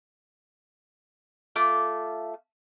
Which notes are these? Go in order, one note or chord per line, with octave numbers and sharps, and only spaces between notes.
A3 F4 D6